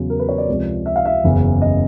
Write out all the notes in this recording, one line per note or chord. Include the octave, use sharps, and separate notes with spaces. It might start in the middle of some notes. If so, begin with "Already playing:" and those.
Already playing: E2 C#3 F#3
A#4
B4
C#5
D5
C#2 C3 F3
E5
F5
E5
F#1 E2 C#3
D#5